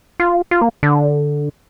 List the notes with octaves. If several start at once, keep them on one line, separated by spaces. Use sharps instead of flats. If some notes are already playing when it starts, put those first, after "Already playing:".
F4
F4
A#3
D3